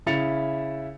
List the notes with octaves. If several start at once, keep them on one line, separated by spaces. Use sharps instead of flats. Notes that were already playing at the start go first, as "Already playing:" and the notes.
C#3 E4 E5 A6 C#7 F7